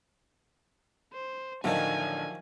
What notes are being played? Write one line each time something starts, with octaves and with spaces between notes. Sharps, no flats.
C5
A1 D3 D#3 F3 F#3 D#4 G#5 A5